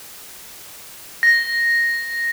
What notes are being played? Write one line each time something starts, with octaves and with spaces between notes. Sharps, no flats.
A#6